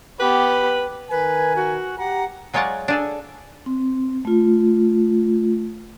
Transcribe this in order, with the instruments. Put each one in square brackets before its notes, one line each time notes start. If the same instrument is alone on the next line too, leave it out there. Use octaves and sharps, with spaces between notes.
[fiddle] B3 G4 [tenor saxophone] B4
[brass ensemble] D#3 A#4 G#5 [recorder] B4
[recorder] F#4
[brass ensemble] G4 A#5 [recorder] F#5
[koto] F#3 G#3 F4 C#5 D5 F#5
D4 G#4 A4
[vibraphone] C4
A3 F4